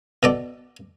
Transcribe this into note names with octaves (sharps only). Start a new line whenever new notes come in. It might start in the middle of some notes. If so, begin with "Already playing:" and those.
B2 A4 D5